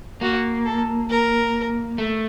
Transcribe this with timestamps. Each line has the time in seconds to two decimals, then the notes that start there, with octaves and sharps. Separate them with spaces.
0.21 A#3 F#4
0.66 A4
1.10 A#4
1.98 A3